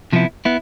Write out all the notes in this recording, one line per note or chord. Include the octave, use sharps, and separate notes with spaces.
C3 F3 B3 E4
B3 E4